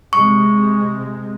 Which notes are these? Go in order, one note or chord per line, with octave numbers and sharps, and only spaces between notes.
C3 G#3 C#6